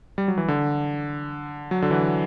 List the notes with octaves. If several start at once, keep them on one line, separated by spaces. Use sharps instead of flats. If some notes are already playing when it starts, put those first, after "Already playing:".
G3
F#3
E3
D3
F#3
D3
E3